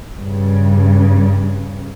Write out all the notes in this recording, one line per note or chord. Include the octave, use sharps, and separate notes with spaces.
G2 C#3